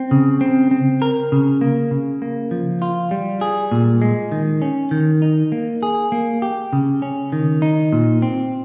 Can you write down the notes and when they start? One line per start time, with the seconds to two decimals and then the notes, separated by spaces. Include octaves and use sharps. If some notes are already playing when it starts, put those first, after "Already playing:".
Already playing: C4
0.11 C#3
0.41 C4
0.71 C4
1.02 A#4
1.32 C#3
1.61 A#3
1.91 C#3
2.22 A#3
2.51 F3
2.82 F4
3.11 G3
3.41 G#4
3.72 A#2
4.02 G#3
4.32 D#3
4.62 C#4
4.91 D#3
5.22 D#4
5.52 A#3
5.83 G#4
6.12 A#3
6.42 G4
6.73 C#3
7.02 C#4
7.32 D#3
7.62 D#4
7.92 A#2
8.22 C4